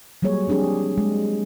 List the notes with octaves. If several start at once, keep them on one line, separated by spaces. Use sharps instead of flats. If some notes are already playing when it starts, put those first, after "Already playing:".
F#3 G3 A#3 G#4 C#5
F3 C4 D4 G4 G#4
G#3